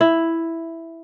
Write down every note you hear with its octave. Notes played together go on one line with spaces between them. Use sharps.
E4